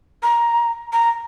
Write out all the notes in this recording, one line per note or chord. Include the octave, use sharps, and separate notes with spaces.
A#5
A#5